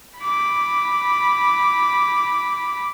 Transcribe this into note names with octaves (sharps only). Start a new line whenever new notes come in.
B5 D6